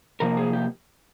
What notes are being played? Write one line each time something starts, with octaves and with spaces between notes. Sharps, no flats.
C3 F3 A#3 A#4
G#4
G4